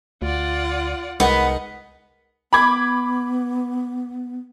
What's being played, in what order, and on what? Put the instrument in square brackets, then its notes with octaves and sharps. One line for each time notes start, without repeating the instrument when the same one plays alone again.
[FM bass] D2 [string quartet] F4 D5 F#5
[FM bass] C2 [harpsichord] G#3 D#4 A#4 [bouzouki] B3
[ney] B3 [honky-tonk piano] B5 D6 G#6